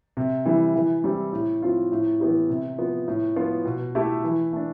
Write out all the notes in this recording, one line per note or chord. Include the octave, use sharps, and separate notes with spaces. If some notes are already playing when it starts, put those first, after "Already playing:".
C3
E3 G3
E3
G3 C4 E4 G4
A2
F3 C4 F4
A2
E3 B3 E4 G4
C3
F3 B3
A2
F3 B3 F4
B2
A3 E4 G4
E3
A3 D4